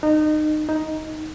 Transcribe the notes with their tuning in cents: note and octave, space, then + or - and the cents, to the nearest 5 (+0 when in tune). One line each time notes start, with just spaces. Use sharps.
D#4 -25
D#4 +10